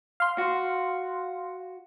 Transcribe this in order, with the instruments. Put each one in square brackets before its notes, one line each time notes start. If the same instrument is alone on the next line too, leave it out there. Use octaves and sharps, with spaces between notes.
[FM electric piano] F5 C6
[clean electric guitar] F#4